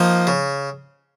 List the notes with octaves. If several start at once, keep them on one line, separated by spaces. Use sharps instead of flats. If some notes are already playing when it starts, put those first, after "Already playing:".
Already playing: F3 A#3 D#4
C#3